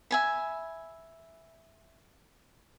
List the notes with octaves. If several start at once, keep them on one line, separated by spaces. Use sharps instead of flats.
E5 G#5 B5